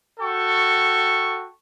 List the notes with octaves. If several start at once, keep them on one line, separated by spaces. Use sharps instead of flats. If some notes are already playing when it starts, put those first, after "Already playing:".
F#4 A4 G5 C#6